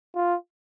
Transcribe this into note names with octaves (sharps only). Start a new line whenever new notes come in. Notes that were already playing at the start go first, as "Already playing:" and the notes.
F4